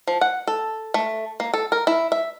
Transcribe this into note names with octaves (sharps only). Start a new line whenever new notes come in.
F3
F#5
A4
A3
A#3
A4
A#4
E4
E5